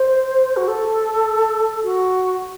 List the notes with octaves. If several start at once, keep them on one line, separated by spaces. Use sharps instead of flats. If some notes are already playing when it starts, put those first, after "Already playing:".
Already playing: C5
F#4
A4
F#4